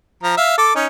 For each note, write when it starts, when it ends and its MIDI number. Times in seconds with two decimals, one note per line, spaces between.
0.23 0.34 53
0.23 0.34 82
0.37 0.58 76
0.37 0.58 77
0.58 0.73 69
0.58 0.73 86
0.76 0.87 61
0.76 0.87 63